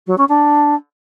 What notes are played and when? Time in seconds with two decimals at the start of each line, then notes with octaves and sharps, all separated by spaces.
0.07 F#3
0.17 C#4
0.28 D4